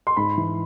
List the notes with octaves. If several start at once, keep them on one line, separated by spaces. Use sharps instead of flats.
C6
G#2 B5
E3